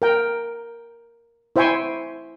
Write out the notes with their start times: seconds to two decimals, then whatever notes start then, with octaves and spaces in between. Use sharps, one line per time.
0.02 A#4 G5
1.56 E4 C5 E5 G5 G#5 C#6